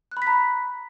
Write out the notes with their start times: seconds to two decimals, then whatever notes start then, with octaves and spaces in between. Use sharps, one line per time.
0.11 F#6
0.17 B5
0.22 B6
0.27 A#5